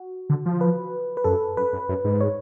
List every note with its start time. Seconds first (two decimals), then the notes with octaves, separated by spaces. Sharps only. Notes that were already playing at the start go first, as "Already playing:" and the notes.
Already playing: F#4
0.30 D3
0.46 F3
0.61 B4
1.17 B4
1.24 F#2 A4
1.57 F#2 B4
1.73 F#2
1.89 F#2
2.04 G#2
2.21 C#5